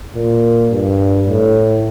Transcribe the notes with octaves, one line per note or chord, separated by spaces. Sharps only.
A#2
G2
A2